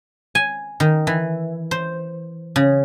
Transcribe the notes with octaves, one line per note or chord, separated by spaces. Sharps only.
G#5
D#3
E3
C5
C#3